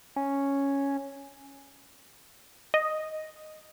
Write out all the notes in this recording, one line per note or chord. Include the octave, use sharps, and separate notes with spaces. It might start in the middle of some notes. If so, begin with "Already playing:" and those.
C#4
D#5